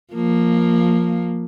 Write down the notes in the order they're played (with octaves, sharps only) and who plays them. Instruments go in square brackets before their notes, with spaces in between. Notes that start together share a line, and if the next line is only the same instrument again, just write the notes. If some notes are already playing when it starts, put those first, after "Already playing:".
[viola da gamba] F3 A#3